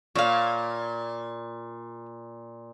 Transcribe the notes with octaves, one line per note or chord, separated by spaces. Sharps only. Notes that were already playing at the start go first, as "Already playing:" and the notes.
A#2 C#5 F5